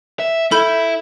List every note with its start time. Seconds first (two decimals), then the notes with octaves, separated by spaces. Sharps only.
0.19 E5
0.51 E4 A4 E5 B5 G6